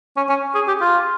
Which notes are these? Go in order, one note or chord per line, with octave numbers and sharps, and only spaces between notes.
C#4
C#4
G#4
G4
F4